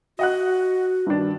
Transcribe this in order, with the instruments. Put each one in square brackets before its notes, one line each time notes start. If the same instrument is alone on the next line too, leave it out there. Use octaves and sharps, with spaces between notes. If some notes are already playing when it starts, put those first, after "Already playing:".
[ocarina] F#4 [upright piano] D#5 F#5 F#6
[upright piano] G2 D#3 D4